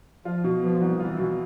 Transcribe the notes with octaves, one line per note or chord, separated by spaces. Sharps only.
F3 F4
B2
F3 B3
C2
E3 F4
B2